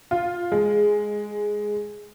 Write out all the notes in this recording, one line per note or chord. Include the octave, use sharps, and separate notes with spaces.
F4
G#3